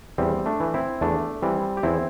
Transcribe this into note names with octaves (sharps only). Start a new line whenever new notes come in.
E2 G3 C4
A3 D4
E3
C4 E4
E2 A3 D4
E3 G3 C4
G4
E2 C4 E4